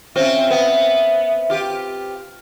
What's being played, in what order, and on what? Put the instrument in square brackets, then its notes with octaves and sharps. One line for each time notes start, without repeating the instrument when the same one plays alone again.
[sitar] C4 C#4 F4 [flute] E5
[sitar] B3
F4 G4